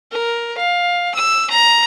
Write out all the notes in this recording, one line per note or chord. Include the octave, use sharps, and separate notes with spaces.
A#4
F5
E6
A#5